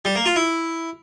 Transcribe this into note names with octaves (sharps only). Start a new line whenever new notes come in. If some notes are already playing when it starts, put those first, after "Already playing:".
G3
A#3
F4
E4